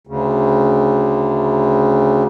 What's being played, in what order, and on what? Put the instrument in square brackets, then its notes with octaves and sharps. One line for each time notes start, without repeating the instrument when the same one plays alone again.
[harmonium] D2 C#3